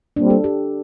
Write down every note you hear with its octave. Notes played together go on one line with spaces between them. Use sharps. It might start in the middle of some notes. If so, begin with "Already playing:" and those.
A#2 G3 C4 D4
A4
G4